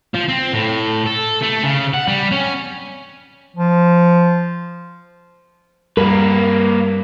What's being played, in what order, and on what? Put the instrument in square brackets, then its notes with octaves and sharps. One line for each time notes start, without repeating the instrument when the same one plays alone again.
[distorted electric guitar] F3
C4
A2
A4
A3
C#3
F#5
G3
C#4
[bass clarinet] F3
[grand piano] G2 [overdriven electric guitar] A#3 B4 [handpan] A#4